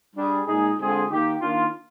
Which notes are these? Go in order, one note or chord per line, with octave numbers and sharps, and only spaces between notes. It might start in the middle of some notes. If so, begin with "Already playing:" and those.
G3 D4 G#4
A#2 G#3 D#4 G#4
D3 G#3 C4 F4 G#4
D#3 A#3 D#4 G4
D#3 A#3 D4 F4